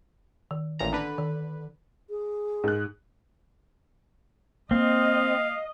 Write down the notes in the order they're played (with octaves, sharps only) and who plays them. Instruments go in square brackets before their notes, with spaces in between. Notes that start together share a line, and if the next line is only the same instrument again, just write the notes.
[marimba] D#3
[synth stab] A1 A#2 A#5
D3 B4
[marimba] D#3
[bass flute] G#4
[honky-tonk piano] G#2 F#6
[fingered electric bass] A#3 [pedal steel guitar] C4 [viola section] D#5 [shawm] F5